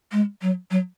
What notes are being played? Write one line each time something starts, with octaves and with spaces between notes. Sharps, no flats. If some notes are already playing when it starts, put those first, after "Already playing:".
G#3
F#3
F#3